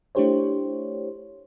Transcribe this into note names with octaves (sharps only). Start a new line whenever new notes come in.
A3 D4 E4 G4 C5 C#5